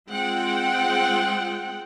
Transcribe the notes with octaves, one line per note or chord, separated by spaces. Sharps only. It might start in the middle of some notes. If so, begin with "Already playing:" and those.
G#3 C4 F4 F#5 G5